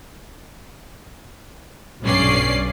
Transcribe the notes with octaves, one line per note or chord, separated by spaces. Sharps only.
B1 G2 C#4 D5 C7